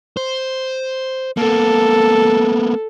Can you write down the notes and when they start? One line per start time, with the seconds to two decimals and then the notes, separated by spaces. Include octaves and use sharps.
0.17 C5
1.37 A#3 B3 A4